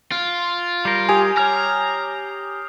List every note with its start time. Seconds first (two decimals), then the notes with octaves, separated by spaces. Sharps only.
0.12 F4 D7
0.85 G3 A#4 F6 G6 C7
1.09 G4 G#5 D6 D#6 F7
1.37 C#5 A#5 F6